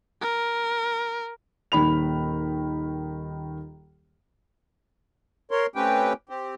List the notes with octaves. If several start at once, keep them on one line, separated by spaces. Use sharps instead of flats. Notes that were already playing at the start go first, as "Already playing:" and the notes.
A#4
D#1 D#3 B5 F7
A#4 C#5 C6
A3 C4 C#4 G4 B4 G5
C4 G4